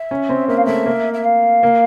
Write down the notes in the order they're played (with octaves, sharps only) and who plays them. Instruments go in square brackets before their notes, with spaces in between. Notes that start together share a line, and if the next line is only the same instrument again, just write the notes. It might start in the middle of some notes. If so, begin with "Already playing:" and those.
Already playing: [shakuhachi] E5
[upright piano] C#4
C4
[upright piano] A#3 [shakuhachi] E5
[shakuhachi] F5
[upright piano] A3 [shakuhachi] E5
[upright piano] A#3
[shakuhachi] E5
F5
[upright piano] A#3